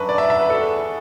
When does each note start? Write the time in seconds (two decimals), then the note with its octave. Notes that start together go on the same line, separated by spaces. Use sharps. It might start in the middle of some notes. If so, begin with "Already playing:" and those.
Already playing: F#2 F#3 D4 F#4 B4
0.09 D5
0.18 E5
0.30 E5
0.40 B4
0.50 E2 E3 B3 F#4 A4